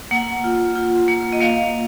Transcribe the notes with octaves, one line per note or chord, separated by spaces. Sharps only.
A#3 F#5
F4
F4
A#3
D#5
A#3 F5